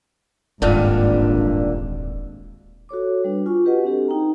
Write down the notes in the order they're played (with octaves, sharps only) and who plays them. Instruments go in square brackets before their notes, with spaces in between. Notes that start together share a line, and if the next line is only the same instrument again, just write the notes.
[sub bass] D#1 [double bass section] G#1 [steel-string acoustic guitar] G2 A#2 D3
[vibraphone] F#4 A4 C#5 D6
G3 D4 B4
F4 G#5 C#6
F#4 G4 B4 D#5 F#5
C4 D4 G4 A4
D#4 G5 A#5